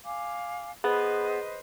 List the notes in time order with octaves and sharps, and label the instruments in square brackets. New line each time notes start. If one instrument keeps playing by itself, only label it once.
[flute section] F5 G#5 D6
[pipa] B3 [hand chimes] G#4 [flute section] B4 C5 D#5